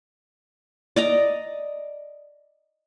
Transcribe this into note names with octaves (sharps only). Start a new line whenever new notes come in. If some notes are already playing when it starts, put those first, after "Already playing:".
D5 D#5 A#5